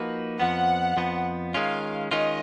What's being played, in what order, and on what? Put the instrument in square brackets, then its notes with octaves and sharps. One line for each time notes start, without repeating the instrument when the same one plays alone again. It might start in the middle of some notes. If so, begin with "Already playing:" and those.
Already playing: [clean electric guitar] F3 A#3 D#4 F#4 B4
[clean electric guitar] F2 F3 B3 [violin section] F#5
[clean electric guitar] F2 F3 B3
[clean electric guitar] D#3 G#3 C#4 F4 [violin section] F5
[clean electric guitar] D#3 G#3 C#4 F4 [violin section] D#5